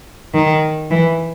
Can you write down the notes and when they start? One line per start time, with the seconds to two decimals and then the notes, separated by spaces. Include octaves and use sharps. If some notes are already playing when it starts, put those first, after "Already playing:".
0.34 D#3
0.90 E3